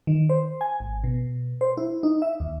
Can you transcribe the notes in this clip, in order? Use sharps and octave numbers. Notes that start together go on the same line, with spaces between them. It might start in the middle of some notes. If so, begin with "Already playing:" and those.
D#3
C5
G#5
G#1
B2
C5
E4
D#4
E5
D#2